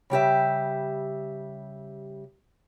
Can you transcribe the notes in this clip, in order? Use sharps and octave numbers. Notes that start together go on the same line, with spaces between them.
C#3 G3 G4 E5